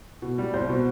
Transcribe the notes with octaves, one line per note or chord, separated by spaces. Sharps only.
B2
G3
C2 C5
B2